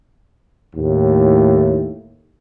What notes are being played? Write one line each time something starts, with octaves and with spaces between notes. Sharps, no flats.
D#2 A2